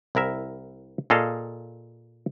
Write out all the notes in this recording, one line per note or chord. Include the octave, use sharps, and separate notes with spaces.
C2 E4 A#4 E5
A#2 G#4 A4 D#5 F5